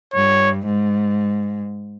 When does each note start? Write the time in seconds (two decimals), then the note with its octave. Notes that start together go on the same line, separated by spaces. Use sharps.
0.14 G2 C#5
0.66 G#2